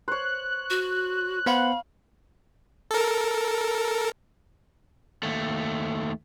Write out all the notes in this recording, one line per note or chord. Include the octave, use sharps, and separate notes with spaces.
C5 C#5 F#6
F#4
B3 C5 F5 F#5 B5
A4 A#4
D#2 A3